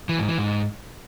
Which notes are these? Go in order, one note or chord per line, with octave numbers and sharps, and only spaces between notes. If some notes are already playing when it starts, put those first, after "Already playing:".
E3
G#2
E3
G#2